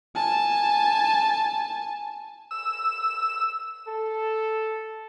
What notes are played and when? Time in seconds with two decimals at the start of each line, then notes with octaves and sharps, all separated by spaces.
0.15 G#5 A5
2.51 E6
3.88 A4